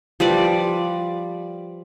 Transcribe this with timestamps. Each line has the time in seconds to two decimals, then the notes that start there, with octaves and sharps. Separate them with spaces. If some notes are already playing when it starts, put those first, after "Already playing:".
0.20 F3 G3 B4 D5